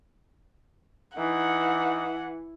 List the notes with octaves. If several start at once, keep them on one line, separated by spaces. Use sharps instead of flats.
E3 D#4 F#5